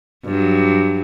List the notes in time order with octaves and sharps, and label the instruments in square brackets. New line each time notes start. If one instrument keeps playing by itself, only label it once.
[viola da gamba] G2 F#3